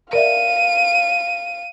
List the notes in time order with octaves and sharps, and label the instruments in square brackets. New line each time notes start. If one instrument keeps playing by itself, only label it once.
[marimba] A#4 D5 E5 [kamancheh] F5 [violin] D#7